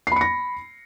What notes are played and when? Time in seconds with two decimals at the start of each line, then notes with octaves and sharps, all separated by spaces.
0.07 C7
0.12 B5
0.16 C#7
0.21 A#6